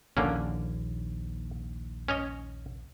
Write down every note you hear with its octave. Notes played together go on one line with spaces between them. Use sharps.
A#1 D#2 D3 A#3 C#4
C#4 C#5 D#5